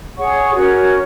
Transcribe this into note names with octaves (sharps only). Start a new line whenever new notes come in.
G#4 C#5 F#5 C#6
C#4 F#4 A#4 C#5